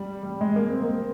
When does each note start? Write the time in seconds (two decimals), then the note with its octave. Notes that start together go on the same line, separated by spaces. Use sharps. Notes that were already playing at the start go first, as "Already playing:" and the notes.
Already playing: G3
0.23 G3
0.41 G#3
0.56 A#3
0.69 C4
0.83 A#3